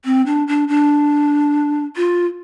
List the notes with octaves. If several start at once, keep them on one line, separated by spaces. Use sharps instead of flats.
C4
D4
D4
D4
F4